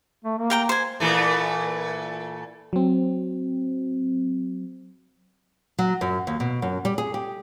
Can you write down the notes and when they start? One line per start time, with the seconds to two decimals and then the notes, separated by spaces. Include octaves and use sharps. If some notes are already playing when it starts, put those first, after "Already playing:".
0.25 A3
0.39 A#3
0.50 A#4 G5 A#5
0.69 C5 G#5
1.00 A#2 E3 A3
2.73 F#3 C4
5.79 F#3
6.01 F#2
6.27 D#2
6.40 B2
6.62 F#2
6.85 G3
6.98 G#4
7.14 G4